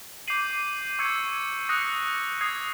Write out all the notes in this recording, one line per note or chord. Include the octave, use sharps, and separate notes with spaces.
D6 G6 C7 D#7 F#7
C#6 E6 G#6 C#7
D#6 F#6 A#6 C#7
D#6 G#6 C7